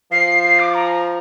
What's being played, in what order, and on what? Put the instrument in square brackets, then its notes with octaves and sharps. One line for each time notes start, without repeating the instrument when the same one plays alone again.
[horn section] F3 [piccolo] C7
[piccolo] C7
D6
A#5